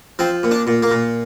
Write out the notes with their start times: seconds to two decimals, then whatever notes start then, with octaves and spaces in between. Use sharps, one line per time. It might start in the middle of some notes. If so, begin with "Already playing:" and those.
0.19 F3 C4
0.43 A#2
0.51 D4
0.67 A#2
0.83 A#3
0.91 A#2